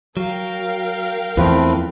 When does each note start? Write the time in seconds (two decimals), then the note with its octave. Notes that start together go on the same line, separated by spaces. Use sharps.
0.17 F#3 A#4 F5 G5
1.37 E2 E3 F3 A3 C4 B4